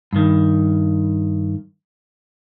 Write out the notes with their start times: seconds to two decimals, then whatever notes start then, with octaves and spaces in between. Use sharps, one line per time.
0.13 G2 D#3